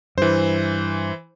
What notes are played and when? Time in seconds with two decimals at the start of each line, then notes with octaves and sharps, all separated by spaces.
0.18 G2 E3 C5